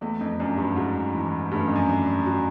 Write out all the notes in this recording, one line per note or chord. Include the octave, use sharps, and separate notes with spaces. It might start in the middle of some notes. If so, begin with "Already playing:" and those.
E2 A3
F2
F#2 D4
G2
G#2 F#4
E3
G2 A3
F#2
F2
F#2
D4
F#4